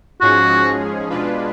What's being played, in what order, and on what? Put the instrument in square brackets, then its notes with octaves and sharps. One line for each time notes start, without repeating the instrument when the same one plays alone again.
[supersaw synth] G#2 F3 G#3 C#4 G#4 [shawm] F#4
[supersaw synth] B2 G#3 D4 F4 B4